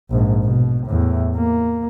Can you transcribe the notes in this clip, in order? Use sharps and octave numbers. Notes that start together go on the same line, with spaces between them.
A#1 G#2
B2
E2 A2
A#3